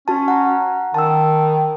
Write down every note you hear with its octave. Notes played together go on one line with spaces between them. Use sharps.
C#4 F#4 A5
F#5 A#5
D#3 A5 E6